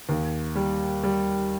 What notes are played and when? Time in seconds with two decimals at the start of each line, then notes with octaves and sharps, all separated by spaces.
0.09 D#2
0.55 G3
1.03 G3